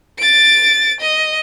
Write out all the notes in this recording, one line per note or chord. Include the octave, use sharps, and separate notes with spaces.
A6 D7
D#5